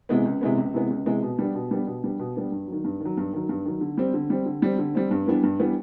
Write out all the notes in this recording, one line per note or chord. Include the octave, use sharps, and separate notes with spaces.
C3 E3 G#3 B3
C#2
C3 E3 G#3 B3
C#2
C3 E3 G#3 B3
C#2
C3 E3 G#3 B3
B2
G3 B3 D4
B2
G3 B3 D4
B2
G3 B3 D4
B2
G3 B3 D4
G2
D#3 F#3
G2
D#3
F#3
G2
D#3 F#3
G2
D#3 F#3
D3
G3 C4
D3
G3 C4
D3
G3 C4
D3
G3 C4
G2
E3 G3 B3 D4
G2
E3 G3 B3 D4